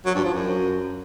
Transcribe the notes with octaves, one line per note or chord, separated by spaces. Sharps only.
F#3
G2
F3
F#2